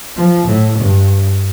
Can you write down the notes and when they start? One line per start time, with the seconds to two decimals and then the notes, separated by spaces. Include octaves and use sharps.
0.16 F3
0.47 A2
0.78 G2